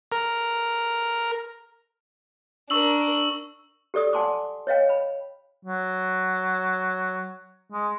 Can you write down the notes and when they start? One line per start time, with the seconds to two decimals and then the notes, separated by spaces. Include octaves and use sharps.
0.12 A#4
2.70 D4 A#4 C#6 E6 F#7
3.94 G4 A4 D5 D#6
4.13 D5 F#5 G#5 A5 C6 D6
4.67 C#5 D#5 F5 G5
4.89 B5
5.65 F#3
7.72 G#3